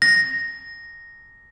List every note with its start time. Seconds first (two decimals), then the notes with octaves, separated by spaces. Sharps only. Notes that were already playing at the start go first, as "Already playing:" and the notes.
0.02 A#6